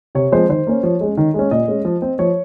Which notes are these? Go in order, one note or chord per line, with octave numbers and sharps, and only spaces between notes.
C3 C#5
F3 G#3 C4 C5
D#3 C5
A#3 C#4
F3 C#5
G#3 C#4
D#3
G#3 C#4
A#2 D#5
G#3 C#4
F3
C4
F3 C#5